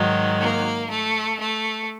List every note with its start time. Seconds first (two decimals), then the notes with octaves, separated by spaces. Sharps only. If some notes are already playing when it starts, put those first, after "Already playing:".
Already playing: G#2 D#3 F#3
0.40 A#3
0.89 A3
1.39 A3